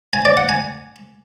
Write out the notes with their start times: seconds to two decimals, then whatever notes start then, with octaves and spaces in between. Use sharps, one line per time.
0.13 G#5
0.25 D5
0.37 F#5
0.49 G#5